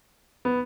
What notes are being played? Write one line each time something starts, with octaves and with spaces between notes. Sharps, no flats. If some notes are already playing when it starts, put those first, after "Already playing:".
B3